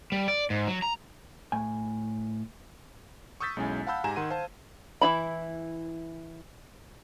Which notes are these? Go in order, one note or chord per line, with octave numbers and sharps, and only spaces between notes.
G3
D5
G#2
F#3
A#5
A2 G#5
C#6 D#6 E6 G6 A6 B6
B1 G#3 C#4 E4 G#5
F5 F#5 A5 B5 E6 G6
G#2 G4 G#5 A#5 G#6 E7
D#3 F#5 C6 D#7
C5 F5 A5
E3 E4 B5